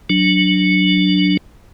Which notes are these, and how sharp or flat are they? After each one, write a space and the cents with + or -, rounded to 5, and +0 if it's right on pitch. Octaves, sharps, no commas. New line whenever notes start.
F#3 -5 D4 +0